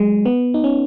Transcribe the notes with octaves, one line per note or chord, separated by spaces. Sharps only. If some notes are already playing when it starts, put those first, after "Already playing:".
Already playing: F#3 G#3
B3
D#4
C#4